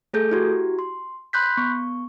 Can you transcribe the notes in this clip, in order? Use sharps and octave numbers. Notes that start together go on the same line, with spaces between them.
A3 G#4 A4 G6
E4 F#4 G4
C6
B5 C6 F#6 G6 B6
B3 C#6